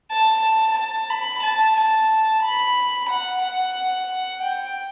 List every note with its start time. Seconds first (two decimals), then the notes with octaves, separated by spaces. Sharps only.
0.11 A5
0.77 A5
1.10 B5
1.43 A5
1.77 A5
2.43 B5
3.10 F#5
3.43 F#5
4.42 G5